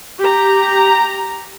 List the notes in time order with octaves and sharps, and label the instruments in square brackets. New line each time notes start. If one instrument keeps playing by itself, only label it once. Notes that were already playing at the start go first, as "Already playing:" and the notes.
[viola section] G4 A#5